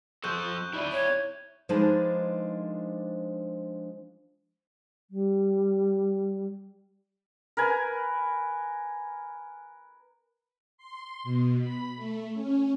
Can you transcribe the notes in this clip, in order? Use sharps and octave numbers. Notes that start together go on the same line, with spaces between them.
F3 A4 C#6 F#6 G6
E4 D5 E5
C#5
F3 G#3 D4 D#4 A#4 B4
G3
A#4 B4 G#5
C6
B2
B5
A3
C#4